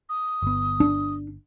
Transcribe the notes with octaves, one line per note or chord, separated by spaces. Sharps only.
D#6
G1 B3
D4